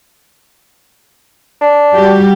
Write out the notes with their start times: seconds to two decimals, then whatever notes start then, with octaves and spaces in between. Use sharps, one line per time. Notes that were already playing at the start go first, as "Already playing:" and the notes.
1.61 D4
1.93 G3 F#4 G4